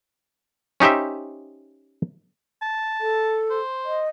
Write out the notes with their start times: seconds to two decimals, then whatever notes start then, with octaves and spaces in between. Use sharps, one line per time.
0.80 C#4 D#4 G4 C5 E5
2.62 A5
3.00 A4
3.50 C5
3.84 D#5